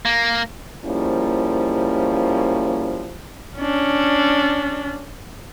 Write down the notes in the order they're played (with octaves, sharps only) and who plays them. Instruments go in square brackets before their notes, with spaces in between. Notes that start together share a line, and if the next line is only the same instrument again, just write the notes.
[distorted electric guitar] A#3
[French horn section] G#2 F3 G3 A#3 C#4 E4
[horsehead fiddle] C#4 D4